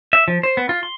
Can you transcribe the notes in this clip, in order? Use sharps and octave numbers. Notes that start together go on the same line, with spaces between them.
E5
F3
C5
B3
F4
C6